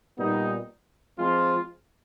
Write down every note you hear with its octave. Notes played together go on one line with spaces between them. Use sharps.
A#2 G3 B3 D#4
F3 G#3 C4 F4